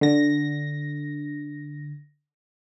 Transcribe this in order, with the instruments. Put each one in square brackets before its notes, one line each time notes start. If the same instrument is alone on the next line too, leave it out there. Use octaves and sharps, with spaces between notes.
[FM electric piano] D3 A#6